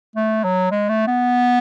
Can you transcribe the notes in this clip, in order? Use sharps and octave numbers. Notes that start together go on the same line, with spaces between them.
A3
F#3
G#3
A3
B3